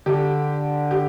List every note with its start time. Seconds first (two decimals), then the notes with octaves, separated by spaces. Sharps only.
0.06 D3 G4
0.91 G4